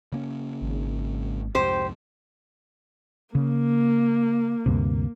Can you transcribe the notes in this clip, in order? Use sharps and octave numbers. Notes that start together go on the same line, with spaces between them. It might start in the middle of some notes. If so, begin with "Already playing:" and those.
C#3 A#3 C#4
G#1
C2 F2 G#2 G4 C5
C#3 A#3
D2 G2 C3